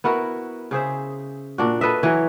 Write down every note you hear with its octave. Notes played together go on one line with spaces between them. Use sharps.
B3 E4 F#4 A#4
C#3 G#4 C5 E5
A#2 D4 F#4
A4 B4 D#5 E5
E3 F#3 C#5